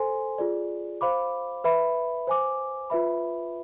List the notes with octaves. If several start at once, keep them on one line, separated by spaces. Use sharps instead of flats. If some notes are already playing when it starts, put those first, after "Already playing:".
Already playing: A4 C5 G#5 C6
F4 G#4 D5
C5 F5 B5 D6
B4 E5 B5
C5 G#5 D6
F4 B4 E5 B5